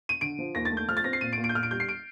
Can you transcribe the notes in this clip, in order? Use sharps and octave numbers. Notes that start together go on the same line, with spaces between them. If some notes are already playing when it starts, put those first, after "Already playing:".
D#7
D3 D7
F3
D#2 A#6
A6
A3
G6
F3 F6
A6
C4 A#6
C7
A#2 D#7
D7
A#2
D7
G6
A#2 F6
D7
G3 G6
C7
D7